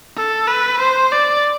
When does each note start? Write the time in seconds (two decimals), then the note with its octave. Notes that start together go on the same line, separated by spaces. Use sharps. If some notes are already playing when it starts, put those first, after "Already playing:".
0.16 A4
0.48 B4
0.80 C5
1.12 D5